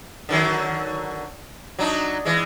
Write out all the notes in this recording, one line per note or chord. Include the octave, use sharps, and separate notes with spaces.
D3 D#3 F#3
F#3 D4 D#4
E3 G#3